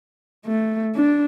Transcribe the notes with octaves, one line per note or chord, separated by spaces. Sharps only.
A3
D4